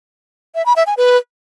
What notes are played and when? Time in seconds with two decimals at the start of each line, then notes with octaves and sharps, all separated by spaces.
0.55 E5
0.66 B5
0.76 E5
0.87 G#5
0.97 B4